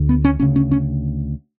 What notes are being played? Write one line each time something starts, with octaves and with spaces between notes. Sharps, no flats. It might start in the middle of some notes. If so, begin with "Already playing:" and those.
Already playing: D2 D3
B3
C#4
D2 C#3 C#4
C#4
C#4